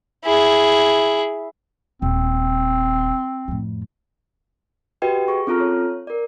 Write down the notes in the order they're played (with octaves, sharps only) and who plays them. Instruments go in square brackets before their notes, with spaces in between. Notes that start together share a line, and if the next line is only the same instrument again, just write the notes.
[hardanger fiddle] E4 G#4
[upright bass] D#1 [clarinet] C4
[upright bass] F2 A2
[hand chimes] F#4 G4 B4 D#5 G5
G#4 C#6
C4 C#4 F4 A4 A#5 F6
C#5
A#4 D5